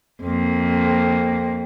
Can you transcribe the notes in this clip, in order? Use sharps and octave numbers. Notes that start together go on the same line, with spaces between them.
F2 A#3